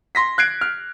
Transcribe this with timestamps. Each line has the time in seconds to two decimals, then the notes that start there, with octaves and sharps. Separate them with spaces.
0.15 C6 A#6 B6
0.38 F#6 G#6 C7 D7
0.61 F6